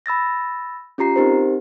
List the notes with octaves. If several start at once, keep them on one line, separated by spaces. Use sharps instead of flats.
B5 E6 A6 A#6
C#4 F4 G4 A#5 C7
C4 D#4 G4 A#4 C5